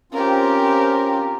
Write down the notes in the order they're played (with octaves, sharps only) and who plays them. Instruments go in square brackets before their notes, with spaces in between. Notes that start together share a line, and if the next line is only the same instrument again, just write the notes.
[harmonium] C4 C#4 F4 [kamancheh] G4 A#4